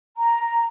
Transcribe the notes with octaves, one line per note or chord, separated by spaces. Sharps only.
A#5